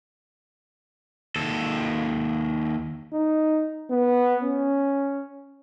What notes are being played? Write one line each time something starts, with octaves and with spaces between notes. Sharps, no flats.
D#2 A4
D#4
B3
C#4